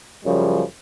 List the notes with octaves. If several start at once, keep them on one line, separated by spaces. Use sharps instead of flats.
F#2 C#3 F3 G3